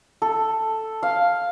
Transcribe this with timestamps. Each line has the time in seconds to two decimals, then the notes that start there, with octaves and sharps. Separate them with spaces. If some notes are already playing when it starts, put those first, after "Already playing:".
0.22 A4
1.03 F5